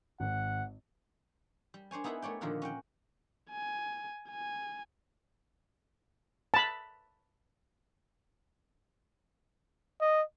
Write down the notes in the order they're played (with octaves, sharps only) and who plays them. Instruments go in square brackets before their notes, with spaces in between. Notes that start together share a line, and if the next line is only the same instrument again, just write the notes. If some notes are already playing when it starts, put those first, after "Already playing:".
[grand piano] G#1 [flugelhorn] F#5
[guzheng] G3
D4 C5 C#5 G#5
B3 D#4 E4 G#4 F#5 B5
A3 C#5 D5 G5
A#2 D3 D#3 F3 A#4 F#5
C#4 F#5 G5
[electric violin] G#5
G#5
[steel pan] A5 B5
[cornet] D#5